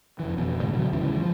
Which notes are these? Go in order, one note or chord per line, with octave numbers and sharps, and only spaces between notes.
F1 E3
F1 B2
G#2 C#3 E3 G#3
B2 D3 F#3
D#2 G#2 C#3 E3
F3